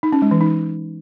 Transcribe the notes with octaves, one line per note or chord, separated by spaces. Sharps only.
D#4
C#4
G#3
E3
D#4